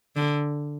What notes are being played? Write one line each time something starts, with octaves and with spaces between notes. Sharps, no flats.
D3